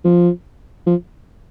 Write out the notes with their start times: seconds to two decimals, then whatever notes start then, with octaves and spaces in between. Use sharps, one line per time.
0.05 F3
0.86 F3